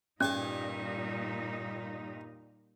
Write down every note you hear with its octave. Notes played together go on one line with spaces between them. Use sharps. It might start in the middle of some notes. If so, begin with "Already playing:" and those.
G2 A#2 G3 C#4 D#4 G#5 A5